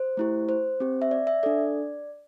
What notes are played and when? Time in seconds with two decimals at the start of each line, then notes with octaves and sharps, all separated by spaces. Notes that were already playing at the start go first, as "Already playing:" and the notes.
Already playing: C5
0.17 A3 E4 G4
0.49 C5
0.80 C4 G4
1.02 E5
1.11 D5
1.27 E5
1.43 D4 A4 D5